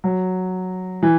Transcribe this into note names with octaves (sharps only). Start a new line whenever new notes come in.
F#3
E3